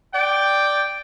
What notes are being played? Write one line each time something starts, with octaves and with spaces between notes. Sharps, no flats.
D5 G5